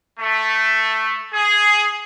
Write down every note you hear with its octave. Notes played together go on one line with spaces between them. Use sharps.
A3
G#4